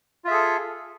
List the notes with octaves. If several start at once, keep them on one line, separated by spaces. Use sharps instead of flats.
F4 G#4 A4 E5